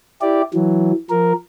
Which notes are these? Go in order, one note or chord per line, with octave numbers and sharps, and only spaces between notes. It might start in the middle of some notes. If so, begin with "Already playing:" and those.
E4 G4 D5
E3 F#3
F3 A#4